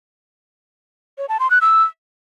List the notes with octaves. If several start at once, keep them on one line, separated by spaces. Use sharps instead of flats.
C#5
A5
C6
F#6
E6